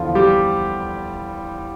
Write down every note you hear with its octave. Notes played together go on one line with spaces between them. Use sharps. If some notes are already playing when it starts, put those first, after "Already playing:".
Already playing: E2 D3 F3 F4
G3 G4